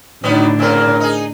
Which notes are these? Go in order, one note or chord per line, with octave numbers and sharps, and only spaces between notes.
A2 D3 D#3 F#3 B3 D4 D#4
A#2 C#3 C4 A#4
D#4 G#4